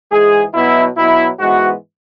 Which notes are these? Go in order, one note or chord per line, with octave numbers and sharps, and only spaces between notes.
G#2 E3 G#3 G#4
B2 F#3 B3 E4
B2 F#3 B3 E4
G#2 E3 G#3 B3 F#4